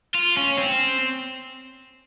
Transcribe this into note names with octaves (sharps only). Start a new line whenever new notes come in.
F4
C#4
C4